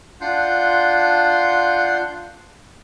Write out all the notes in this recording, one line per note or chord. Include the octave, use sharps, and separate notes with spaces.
D4 F4 F#5 C6 G6